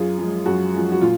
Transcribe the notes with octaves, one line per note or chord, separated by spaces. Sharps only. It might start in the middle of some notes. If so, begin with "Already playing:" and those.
Already playing: F#2 F4 G#4
F3 G#3
F#2 F#4
F3 G#3
F#4
A#2 F4